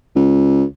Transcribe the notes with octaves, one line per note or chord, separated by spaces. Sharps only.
C#2